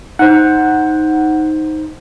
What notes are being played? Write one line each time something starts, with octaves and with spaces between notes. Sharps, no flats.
D#4 C5 F#5